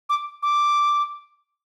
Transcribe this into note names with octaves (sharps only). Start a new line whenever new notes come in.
D6
D6